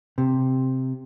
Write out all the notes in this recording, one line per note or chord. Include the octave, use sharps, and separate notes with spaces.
C3